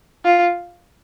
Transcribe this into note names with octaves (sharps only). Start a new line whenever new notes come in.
F4